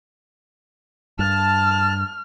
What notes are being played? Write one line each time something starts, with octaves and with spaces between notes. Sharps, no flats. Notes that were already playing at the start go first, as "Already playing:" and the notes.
G2 A5 F6